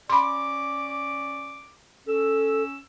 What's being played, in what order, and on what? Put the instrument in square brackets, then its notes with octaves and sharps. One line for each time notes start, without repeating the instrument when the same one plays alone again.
[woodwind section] C#4 D5 D6 [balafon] B5 C6
[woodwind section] C#4 E6 [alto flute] A4